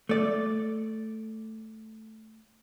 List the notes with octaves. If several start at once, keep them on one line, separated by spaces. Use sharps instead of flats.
A3 D5